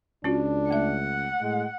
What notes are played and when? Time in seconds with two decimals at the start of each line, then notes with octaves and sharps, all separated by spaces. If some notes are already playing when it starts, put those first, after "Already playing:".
0.24 C#2 C#4 D4 F4 F#4
0.71 A3 E5 F#5
1.41 A2 G#3